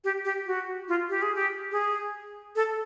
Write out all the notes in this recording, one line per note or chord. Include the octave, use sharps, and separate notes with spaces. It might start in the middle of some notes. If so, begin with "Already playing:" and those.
G4
G4
F#4
F4
G4
G#4
G4
G#4
A4